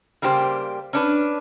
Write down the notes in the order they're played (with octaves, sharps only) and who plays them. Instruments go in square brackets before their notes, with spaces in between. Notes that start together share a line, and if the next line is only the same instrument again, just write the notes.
[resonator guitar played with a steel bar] C#3 G3 A#3 G4 C5
C#4 D4 B4